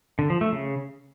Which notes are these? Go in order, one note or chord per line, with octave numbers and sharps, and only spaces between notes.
D3
F3
A3
C#3